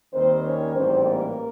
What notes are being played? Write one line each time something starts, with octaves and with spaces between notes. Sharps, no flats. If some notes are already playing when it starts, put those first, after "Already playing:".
D#2 D#3 G3 C4 C5
C#4 C#5
A1 G#2 E3 G3 C4 C5
A#3 A#4